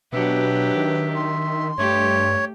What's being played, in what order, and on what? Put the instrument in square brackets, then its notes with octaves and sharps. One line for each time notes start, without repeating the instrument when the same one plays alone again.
[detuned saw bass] B2 [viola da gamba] F#3 D4 G4 [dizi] B4 [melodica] E5
[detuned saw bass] D#3
[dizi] C6
[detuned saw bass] G2 [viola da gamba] A3 G4 [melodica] C#5